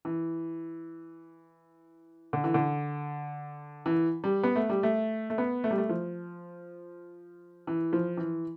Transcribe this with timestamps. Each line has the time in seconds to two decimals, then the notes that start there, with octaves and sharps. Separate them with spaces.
0.05 E3
2.33 D3
2.44 E3
2.54 D3
3.86 E3
4.24 G3
4.43 B3
4.56 A3
4.69 G3
4.83 A3
5.30 A3
5.38 B3
5.64 A3
5.71 G3
5.78 A3
5.89 F3
7.67 E3
7.93 F3
8.17 E3